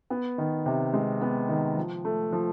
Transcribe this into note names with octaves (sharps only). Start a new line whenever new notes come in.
B3
D#3
C3
G#3
B3
D#3
F3
A3
F3